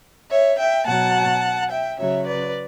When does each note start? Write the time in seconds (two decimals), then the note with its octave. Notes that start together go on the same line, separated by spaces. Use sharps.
0.30 C#5 E5
0.58 E5 G5
0.86 B2 F#3 F#5 A5
1.70 E5 G5
1.98 C#3 F#3 C#5 E5
2.26 B4 D5